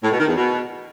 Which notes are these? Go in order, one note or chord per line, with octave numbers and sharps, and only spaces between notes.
A2
B2
D#3
E2
B2